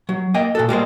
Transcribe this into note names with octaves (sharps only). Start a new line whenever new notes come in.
F#3
A#3 D#5 G5
A#2 F#4 A4
G3 G#3 A#3 C5